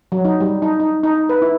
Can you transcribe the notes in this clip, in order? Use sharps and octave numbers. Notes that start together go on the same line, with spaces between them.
F#3
D#4
G3
D#4
D#4
D#4
B4
E4